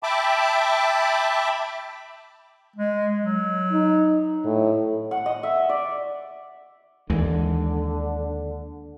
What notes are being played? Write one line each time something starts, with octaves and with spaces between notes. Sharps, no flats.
E5 G5 A5 B5 D6
G#3
F#3
D#4
A2
F#5
D#5
E5
D5
D#2 D3 E3 G#3